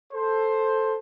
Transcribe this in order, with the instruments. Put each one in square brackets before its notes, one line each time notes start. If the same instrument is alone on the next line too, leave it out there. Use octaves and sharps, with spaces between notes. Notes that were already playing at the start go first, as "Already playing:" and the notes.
[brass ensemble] A4 C5